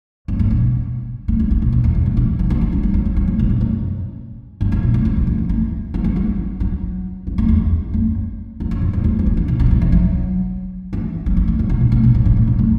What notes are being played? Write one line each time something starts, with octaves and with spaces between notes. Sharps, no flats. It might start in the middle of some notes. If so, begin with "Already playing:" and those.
F#2
A2
B2
D3
E3
E3
B2
F#2
E2
A2
B2
E3
D3
D3
E3
F#3
E3
F#3
E3
F#3
D3
B2
A2
F#2
F#2
A2
B2
D3
F#3
E3
D3
F#3
E3
E3
D3
F#3
F#3
E3
D3
E2
F#2
E2
F#2
A2
F#2
E2
F#3
E3
D3
B2
D3
F#3
E3
E3
F#3
E3
F#3
E3
D3
A2
B2
B2
B2
F#2
A2
A2
D3
E3
F#3